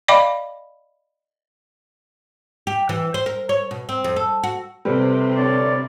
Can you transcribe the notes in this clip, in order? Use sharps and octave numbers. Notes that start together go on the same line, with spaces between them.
D5 D#5 F5 G5 B5 D6
G4
E3
C5
A#4
C#5
B2
C4
F2
A4
F#4
C3 G3 A4 B4 C5
D3 C#5 D5